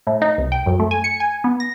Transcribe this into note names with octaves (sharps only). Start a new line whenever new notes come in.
A2
D#4
C2
G5
F#2
A3
G#5
C#7
G#5
B3
A#6